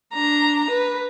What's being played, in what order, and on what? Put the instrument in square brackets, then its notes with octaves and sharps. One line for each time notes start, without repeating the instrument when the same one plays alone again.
[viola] D4 A#5
B4